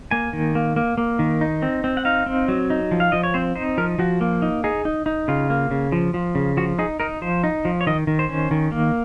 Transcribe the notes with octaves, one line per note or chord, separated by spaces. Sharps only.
A#3 G#5
D#3
A#3
A#3
A#3
D#3
D#4
C4
C4
F#5
D#4 F5
C4
F#3
D#4
F3
F5
F3 D#5
C#5
C4 C5
D#4 C5
F3 A#4
F3 F#4
A#3
D#4
D#4 G#4
D#4
D#4
C#3 F4
A#3
C#3
F3
F3
C#3
F3 F#4
D#4 G#4
D#4 A#4
F3 C5
D#4
F3
C#5
D#3 D#5
D#3
C5
C#4
D#3
A#3